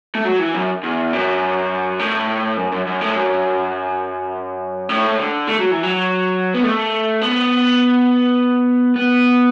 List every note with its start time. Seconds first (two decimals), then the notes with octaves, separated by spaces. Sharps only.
0.15 A3
0.25 F#3
0.39 E3
0.55 F#2
0.83 E2
1.13 F#2
1.99 A2
2.57 F#2
2.72 F#2
2.86 F#2
3.01 A2
3.15 F#2
4.89 A2
5.18 D3
5.48 A3
5.60 F#3
5.72 E3
5.83 F#3
6.54 B3
6.64 A3
7.22 B3
8.96 B3